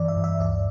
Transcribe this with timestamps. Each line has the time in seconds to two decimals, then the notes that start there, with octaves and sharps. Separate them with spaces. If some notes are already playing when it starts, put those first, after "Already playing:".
Already playing: G2 E3 D5
0.08 E5
0.16 G2
0.24 E5
0.39 D2 D5